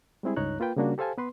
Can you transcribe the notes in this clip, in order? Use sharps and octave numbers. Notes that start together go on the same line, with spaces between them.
G3 G#3 C4 E4 G#4
C#2 G2 D#4 C#5 A#5 F#6
A#3 F4 B4 G5
C#3 G3 A#3 D4 F#4
G4 A4 C5 F5 G#5 A5
B3 B4 C6